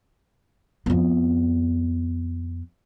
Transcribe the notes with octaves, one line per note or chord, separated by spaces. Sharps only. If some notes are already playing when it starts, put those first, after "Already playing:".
F2 B3